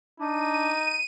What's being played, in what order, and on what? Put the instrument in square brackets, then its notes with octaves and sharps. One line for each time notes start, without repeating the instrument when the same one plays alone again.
[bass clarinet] D4 [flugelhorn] D#4 [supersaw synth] D#7